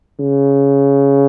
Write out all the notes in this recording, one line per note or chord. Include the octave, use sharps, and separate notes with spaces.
C#3